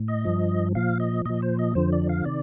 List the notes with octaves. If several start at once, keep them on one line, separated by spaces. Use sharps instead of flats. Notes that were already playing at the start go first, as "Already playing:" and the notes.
Already playing: A2
D#5
G2 F3
A#2 F3 F5
D#5
A#2 F3 D#5
C5
D#5
F2 D3 F3 C5
D5
F5
C3 D#3 D5